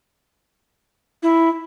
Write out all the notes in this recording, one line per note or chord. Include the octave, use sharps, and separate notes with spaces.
E4